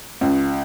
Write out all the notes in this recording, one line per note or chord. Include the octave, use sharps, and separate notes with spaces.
C#2